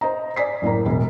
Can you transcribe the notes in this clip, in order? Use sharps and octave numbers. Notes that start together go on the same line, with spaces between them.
C5 D#5 A#5
D5 G#5 B6 C7
F#1 A2 A#3 A#5
E1